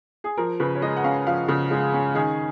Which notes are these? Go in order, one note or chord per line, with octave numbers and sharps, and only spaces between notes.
G#4
F3 A#4
C#3 B4
C#5
G#3 D#5
F#5
C#4 F5
F3 F5
C#3
G#3
C#4
D#3 G#4